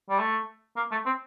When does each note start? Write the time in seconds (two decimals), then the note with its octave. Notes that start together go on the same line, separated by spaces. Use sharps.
0.10 G3
0.19 A3
0.77 A#3
0.92 A3
1.06 C4